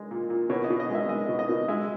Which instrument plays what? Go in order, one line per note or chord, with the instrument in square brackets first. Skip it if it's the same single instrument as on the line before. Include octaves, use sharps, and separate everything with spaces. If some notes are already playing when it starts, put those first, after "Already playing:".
Already playing: [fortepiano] G#3
A#2
A#2
B2 C#5
D#5
B2
D#5
G#3 E5
G#3 D#5
B2
D#5
B2
G#3 E5